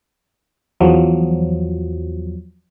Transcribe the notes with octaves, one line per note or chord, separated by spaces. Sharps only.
E2 F3 F#3